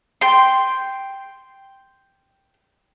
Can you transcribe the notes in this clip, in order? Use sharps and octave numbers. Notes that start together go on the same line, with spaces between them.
G5 C6